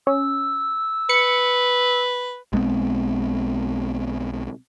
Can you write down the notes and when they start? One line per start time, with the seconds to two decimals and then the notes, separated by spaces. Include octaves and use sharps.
0.07 C#4 E6
1.09 B4 C#7
2.53 B1 G#3 B3 C4